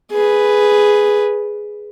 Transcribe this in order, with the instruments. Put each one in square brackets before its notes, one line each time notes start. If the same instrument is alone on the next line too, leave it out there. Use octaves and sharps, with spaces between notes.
[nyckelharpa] G#4 B4